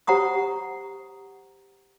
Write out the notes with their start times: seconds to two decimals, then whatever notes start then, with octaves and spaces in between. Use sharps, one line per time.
0.07 G4 C5 F#5 A#5 C#6 D#6